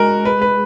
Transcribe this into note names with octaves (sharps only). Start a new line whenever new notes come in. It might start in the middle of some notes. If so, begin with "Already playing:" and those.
Already playing: G#3 F#4 A#4
B4
B4